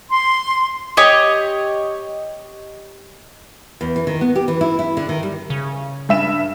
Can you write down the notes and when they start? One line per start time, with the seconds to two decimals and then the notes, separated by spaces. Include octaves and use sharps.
0.10 C6
0.97 G4 C#5 D#5
3.81 E2
3.96 E3
4.07 D#3
4.21 B3
4.36 G4
4.48 E3
4.61 E4
4.79 E4
4.97 D3
5.09 D#3
5.23 G3
5.50 C#3
6.09 G2 E5 E7